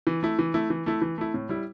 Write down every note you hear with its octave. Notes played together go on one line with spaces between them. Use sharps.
E3
A3 E4
E3
A3 E4
E3
A3 E4
E3
A3 E4
A2
G3 E4